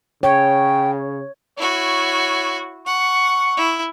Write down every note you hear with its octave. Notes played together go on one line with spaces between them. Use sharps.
C#3 C#5 G5
E4 F#4 C#5
F#5 C#6
E4